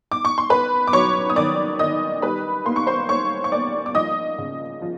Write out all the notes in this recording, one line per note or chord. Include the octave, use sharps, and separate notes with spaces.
D6
C#6
C6
B3 B4 B5
D6
F#3 C#5 C#6
D#6
D#3 D5 D6
D#3 D#5 D#6
G3 B4 B5
A#3 C6
C#6
C5 C6
A#3 C#5 C#6
C#6
A#3 D5 D6
D6
F3 D#5 D#6
C#3
F3